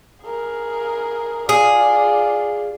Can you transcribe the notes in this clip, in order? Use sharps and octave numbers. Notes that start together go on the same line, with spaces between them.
G#4 A#4
F4 G#4 D5